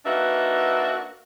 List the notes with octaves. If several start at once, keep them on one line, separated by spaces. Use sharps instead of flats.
A#3 D4 D#4 F#4 B4 E5